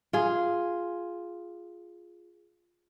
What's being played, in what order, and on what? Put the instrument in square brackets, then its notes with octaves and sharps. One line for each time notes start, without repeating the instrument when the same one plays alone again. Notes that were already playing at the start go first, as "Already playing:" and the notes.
[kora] F4 G#4